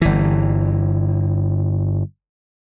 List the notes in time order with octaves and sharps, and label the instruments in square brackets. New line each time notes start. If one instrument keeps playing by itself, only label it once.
[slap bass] G1 E3